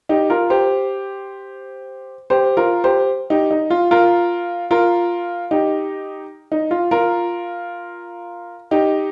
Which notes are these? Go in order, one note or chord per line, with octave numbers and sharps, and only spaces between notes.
D#4 G4
F4 A#4
G4 C5
G4 C5
F4 A#4
G4 C5
D#4 G4
D#4
F4
F4 A#4
F4 A#4
D#4 G4
D#4
F4
F4 A#4
D#4 G4